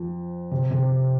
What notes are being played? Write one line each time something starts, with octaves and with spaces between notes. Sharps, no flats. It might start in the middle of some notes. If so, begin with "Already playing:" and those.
Already playing: F2 F3
C3
C3